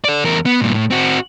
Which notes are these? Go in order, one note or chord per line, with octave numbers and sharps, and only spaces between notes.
A4 D5
E2 A#4
B3
G2 A#2
A2
C4 F#4